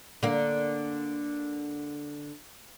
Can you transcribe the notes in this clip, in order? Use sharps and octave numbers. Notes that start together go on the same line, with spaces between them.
D3 A#3